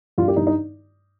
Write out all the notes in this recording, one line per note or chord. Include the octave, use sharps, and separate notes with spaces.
G2 F4
G4
G2 D#4
D#4